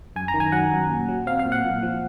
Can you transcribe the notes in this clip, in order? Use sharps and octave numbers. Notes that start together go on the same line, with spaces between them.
F#2 G#5
A#5
D#3
G#5
F#3 F#5
F#2
A#2
F#3
C4 F5
F5
A#2
F#5
A#2
F3